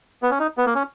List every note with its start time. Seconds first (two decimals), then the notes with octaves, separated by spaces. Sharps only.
0.23 B3
0.31 C#4
0.39 D#4
0.58 B3
0.66 A#3
0.75 C#4